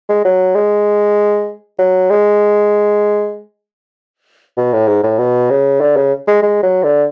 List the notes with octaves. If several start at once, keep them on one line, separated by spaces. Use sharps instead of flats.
G#3
F#3
G#3
F#3
G#3
B2
A2
G#2
A2
B2
C#3
D3
C#3
G#3
G#3
F#3
D3